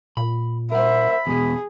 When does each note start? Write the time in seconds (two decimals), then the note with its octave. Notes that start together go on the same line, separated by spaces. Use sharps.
0.17 A#2 B5
0.72 A#4 C5 E5 F#5 B5
1.27 E2 B2 G#4 D#5